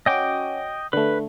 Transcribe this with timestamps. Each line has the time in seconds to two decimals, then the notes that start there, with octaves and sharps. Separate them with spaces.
0.06 C#4 F#4 D#5 G5 D6
0.93 D3 A3 B4